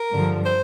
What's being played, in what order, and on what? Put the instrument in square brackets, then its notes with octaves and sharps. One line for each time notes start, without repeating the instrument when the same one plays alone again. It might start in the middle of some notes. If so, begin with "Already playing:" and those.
Already playing: [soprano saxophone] A#4
[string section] G2 D3 F3
[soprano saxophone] C5